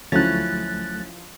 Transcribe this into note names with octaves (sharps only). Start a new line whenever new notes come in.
D2 F3 F#3 A3 C#4 E4 F#6 A6